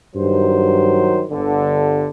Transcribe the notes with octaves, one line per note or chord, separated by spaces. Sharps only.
G2 D#3 F#3 C5
G1 G2 D3